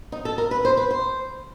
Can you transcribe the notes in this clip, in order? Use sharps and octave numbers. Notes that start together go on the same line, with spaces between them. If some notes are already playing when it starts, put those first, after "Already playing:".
D#4
A4
A#4
B4
C5
B4
C5